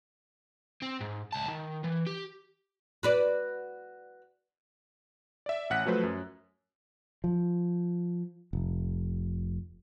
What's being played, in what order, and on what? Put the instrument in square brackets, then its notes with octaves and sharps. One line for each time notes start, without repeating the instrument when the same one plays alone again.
[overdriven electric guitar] C4
G#2
C#2 A5
D#3
E3
G4
[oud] F#4 B4 D5
[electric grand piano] D5 E5
A1 F#5 F#6 B6
F3 F#3 A3 B4 C5
F#2
[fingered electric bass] F3
F1